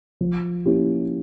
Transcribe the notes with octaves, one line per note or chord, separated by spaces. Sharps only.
F3
A#3 C#4 E4 G4